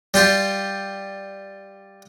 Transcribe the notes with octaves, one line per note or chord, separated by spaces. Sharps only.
G3 F4 G4